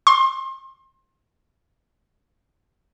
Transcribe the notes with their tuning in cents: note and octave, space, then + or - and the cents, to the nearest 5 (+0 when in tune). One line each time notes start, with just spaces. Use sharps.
C6 +30